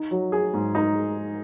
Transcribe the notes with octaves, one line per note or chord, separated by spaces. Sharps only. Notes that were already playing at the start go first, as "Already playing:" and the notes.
Already playing: D#4
F#3
G#4
G#2
D#4